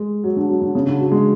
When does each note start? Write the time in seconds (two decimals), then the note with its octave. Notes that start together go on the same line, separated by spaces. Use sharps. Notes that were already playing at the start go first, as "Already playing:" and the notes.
Already playing: G#3
0.24 F#3
0.37 D3
0.49 F#3
0.62 D3
0.75 C#3
0.87 D3
1.00 F#3
1.11 G#3